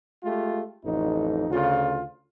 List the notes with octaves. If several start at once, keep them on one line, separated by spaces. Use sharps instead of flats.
G#3 A3 F4 G4
A1 F2 D#4
D2 C#3 F4